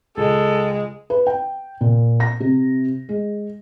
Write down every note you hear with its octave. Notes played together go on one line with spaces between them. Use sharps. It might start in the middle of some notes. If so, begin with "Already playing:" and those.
C#2 G#3 A4
B4
G5
A#2
A#6
C3
G#3